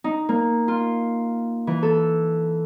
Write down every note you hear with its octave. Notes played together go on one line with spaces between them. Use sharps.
D#4
A#3
F4
E3
A4